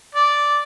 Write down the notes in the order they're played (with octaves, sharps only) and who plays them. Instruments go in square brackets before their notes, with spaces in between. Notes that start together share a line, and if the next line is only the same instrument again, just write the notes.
[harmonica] D5